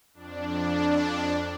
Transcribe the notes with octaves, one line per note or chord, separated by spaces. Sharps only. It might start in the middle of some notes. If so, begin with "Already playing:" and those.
F2 D4